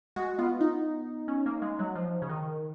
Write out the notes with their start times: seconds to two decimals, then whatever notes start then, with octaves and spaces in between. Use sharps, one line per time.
0.16 G#3 F#4
0.38 B3 F4
0.60 D#4
1.28 C#4
1.46 A#3
1.62 G#3
1.79 F#3
1.95 F3
2.22 C#3
2.29 D#3